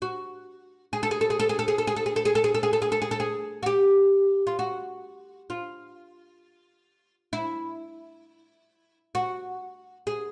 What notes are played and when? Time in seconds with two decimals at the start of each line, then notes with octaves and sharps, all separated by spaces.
0.02 F#4
0.93 G#4
1.03 A4
1.11 G#4
1.21 A4
1.30 G#4
1.40 A4
1.49 G#4
1.59 A4
1.68 G#4
1.78 A4
1.87 G#4
1.96 A4
2.06 G#4
2.16 A4
2.25 G#4
2.35 A4
2.44 G#4
2.54 A4
2.63 G#4
2.73 A4
2.82 G#4
2.92 A4
3.02 G#4
3.11 A4
3.20 G#4
3.63 F#4
3.66 G4
4.47 F4
4.59 F#4
5.50 F4
7.33 E4
9.15 F#4
10.07 G#4